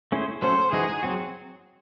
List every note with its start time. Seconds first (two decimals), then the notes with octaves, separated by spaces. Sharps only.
0.12 A3 C#4 E4 G#4 C5
0.42 F#3 A3 C#4 F#4 A4 C5
0.72 E3 G#3 D#4 F#4 G#4
1.03 F#3 C4 F#4